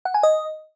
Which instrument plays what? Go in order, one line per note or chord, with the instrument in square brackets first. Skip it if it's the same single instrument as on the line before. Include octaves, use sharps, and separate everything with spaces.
[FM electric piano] F#5
G#5
D#5